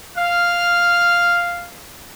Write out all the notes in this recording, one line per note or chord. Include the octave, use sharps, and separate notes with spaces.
F5 F6